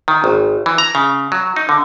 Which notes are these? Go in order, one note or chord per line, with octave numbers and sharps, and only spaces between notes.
D#3
G#1
E3
A#5
C#3
F#3
D#4
D3